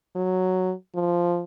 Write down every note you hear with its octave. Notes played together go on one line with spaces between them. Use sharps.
F#3
F3